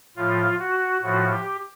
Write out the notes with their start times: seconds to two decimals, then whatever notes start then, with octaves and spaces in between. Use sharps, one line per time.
0.16 A2 F3 F4
0.59 F#4
1.02 A2 F3 F#4
1.31 G4